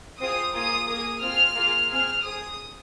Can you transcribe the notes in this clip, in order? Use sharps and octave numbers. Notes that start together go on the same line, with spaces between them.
C4 F4 G#4 D#6
A#3 F4 G#4 D#6
A#3 G#4 D#6
C4 F4 G#4 F6
A#3 F4 G#4
C4 G#4 F6
C4 G#4 D#6